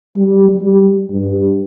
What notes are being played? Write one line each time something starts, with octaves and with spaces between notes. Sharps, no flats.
G3
G3
G2